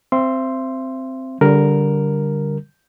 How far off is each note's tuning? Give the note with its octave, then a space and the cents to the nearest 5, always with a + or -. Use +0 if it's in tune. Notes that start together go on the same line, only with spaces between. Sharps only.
C4 -5 E5 +35 C6 +0
D3 -20 G3 +0 A#4 +0